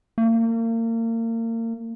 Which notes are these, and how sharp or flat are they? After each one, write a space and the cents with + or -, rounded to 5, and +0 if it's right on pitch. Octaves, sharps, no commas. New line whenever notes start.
A#3 -35